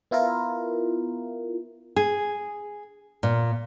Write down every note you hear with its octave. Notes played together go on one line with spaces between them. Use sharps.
B3 E4 F4 A#4
G#4
A#2